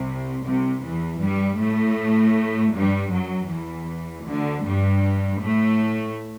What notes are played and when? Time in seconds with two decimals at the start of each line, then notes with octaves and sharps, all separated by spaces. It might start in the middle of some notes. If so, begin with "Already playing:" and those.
Already playing: C2 C3
0.45 C2 C3
0.83 E2 E3
1.21 G2 G3
1.59 A2 A3
2.74 G2 G3
3.12 F#2 F#3
3.51 E2 E3
4.26 D2 D3
4.64 G2 G3
5.41 A2 A3